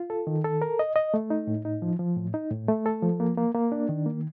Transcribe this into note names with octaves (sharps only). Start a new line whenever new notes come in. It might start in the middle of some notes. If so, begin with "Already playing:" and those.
Already playing: F4
A4
D#3
A4
A#4
D#5
D#5
A3
D#4
A2
D#4
F3
F3
A2
D#4
A2
A3
A4
F3
A#3
A#3
A#3
D4
D#3
A#3